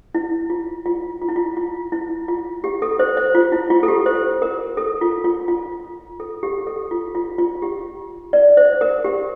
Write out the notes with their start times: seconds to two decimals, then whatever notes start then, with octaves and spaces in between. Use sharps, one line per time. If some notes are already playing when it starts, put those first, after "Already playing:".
0.15 E4
0.50 F4
0.86 F4
1.22 F4
1.29 E4
1.36 F4
1.57 F4
1.92 E4
2.28 F4
2.64 G4
2.82 A4
2.99 C5
3.17 C5
3.35 F4
3.52 E4
3.70 F4
3.83 A4
3.88 G4
4.06 C5
4.42 A#4
4.77 A4
5.01 F4
5.24 F4
5.48 F4
6.20 A4
6.43 G4
6.67 A4
6.91 F4
7.15 F4
7.38 F4
7.62 G4
8.33 D5
8.57 C5
8.81 A#4
9.04 G4